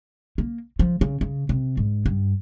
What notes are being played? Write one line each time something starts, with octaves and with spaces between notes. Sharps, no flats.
A#3
F3
C#3
C#3
C3
G#2
G2